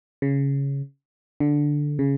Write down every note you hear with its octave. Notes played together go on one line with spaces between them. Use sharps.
C#3
D3
C#3